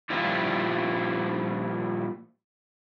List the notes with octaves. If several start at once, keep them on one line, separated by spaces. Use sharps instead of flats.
A#2 F3 G3 E4 F4